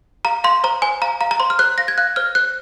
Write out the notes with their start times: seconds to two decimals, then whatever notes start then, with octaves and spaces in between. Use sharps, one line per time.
0.25 F5 A#5
0.44 F5 C6
0.64 C5 A#5
0.82 C5 G#5
1.02 F5 A#5
1.21 F5 A#5
1.31 A#5
1.40 C5 C6
1.50 F6
1.59 C5 F#6
1.78 F5 A#6
1.88 G#6
1.98 F5 F#6
2.16 C5 F6
2.35 C5 F#6